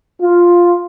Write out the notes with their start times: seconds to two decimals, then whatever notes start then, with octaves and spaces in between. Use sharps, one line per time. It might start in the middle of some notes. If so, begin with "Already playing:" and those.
0.21 F4